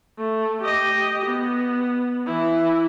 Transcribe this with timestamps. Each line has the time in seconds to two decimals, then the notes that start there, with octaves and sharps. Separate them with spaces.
0.18 A3
0.62 G4 D#5
1.26 B3
2.27 E3 E4